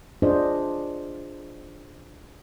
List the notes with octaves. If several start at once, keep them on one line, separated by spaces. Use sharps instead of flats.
D4 F4 G#4 C5 D#5